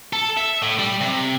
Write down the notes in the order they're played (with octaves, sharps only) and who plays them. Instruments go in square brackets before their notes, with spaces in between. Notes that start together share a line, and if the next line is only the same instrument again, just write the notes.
[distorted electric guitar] A4
E5
A2
G3
C3